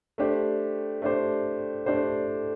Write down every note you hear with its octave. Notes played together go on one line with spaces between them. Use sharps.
A3 D4 G4 C5
A3 D4 G4 C5
A3 D4 G4 C5